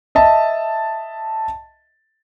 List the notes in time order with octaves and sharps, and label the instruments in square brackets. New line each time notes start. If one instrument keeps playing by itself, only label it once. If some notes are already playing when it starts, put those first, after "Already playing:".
[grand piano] D#5 E5 A5